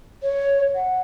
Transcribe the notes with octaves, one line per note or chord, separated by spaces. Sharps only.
C#5
F#5